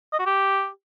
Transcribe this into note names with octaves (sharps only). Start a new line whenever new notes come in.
D#5
F#4
G4